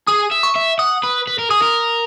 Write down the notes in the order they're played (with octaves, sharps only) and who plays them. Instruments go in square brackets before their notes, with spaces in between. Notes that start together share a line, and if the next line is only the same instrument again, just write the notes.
[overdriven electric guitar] G#4 [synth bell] D#6
[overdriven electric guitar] E5
[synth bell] C#6
[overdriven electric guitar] E5
[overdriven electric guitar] F#5 [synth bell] D#6
[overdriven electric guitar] B4
B4
A#4
[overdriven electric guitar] G#4 [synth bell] D#6
[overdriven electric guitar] A#4